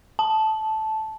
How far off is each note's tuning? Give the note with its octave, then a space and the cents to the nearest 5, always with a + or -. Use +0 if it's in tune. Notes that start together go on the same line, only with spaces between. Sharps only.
A5 -10